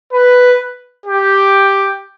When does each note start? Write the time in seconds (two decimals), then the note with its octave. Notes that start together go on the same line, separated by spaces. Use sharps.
0.13 B4
1.06 G4